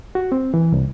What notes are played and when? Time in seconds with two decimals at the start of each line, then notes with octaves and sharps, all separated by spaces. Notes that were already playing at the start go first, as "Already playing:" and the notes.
0.15 F#4
0.32 C4
0.54 E3
0.72 C2